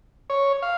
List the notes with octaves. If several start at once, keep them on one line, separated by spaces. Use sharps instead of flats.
C#5
F5